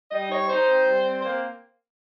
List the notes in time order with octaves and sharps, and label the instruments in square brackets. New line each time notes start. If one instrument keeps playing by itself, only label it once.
[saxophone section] G3 D#5
D#4 C#5
D#4 C5
C4
G3
C4
A#3 C5